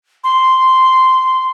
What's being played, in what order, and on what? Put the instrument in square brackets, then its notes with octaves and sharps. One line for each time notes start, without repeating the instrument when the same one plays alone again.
[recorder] C6